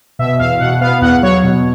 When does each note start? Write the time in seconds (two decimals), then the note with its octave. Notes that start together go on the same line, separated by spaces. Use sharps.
0.19 B2 E5
0.39 E2 F5
0.60 B2 F#5
0.81 B3 F5
1.01 E2 F#5
1.23 F#3 C#5
1.44 B2